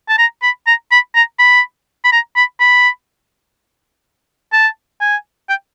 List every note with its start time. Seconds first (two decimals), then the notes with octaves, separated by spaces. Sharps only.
0.09 A5
0.18 A#5
0.43 B5
0.67 A#5
0.92 B5
1.15 A#5
1.39 B5
2.04 B5
2.12 A#5
2.36 B5
2.60 B5
4.53 A5
5.01 G#5
5.49 G5